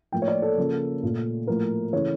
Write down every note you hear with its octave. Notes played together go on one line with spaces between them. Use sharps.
A2 F3 A#3 G5
C#5
D5
A4
C#3 F3 A#3
A#2 A3
A2 F3 A#3 A#4
C#3 E3 A3 C#5